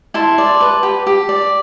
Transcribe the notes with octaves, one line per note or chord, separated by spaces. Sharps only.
E4 A5 C6
D5
B4
G4
G4
D5